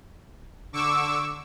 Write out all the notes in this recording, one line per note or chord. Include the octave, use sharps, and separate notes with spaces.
D3 C#6 D6 E6